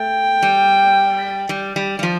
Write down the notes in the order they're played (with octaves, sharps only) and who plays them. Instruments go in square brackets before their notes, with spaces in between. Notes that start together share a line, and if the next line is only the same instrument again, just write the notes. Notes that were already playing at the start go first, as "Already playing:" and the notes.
Already playing: [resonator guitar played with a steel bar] A3 [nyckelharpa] G5
[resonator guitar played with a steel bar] G3
G3
G3
G3
F3